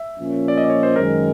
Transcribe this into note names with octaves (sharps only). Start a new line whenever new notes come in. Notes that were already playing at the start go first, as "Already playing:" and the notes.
Already playing: E5
A#2 F3 A#3 C#4
D5
D#5
D5
C#5
C5
F#2 D#3 G#3 A#4